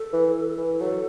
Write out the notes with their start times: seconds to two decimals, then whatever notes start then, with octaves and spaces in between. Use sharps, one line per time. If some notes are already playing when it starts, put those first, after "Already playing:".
Already playing: A4
0.13 E3
0.58 E3
0.80 F#3 A4